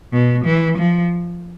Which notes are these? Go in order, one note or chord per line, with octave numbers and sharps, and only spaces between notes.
B2
E3
F3